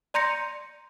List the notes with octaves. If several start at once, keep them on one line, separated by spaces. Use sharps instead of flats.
D5 A#5 C6 G6 A#6 C#7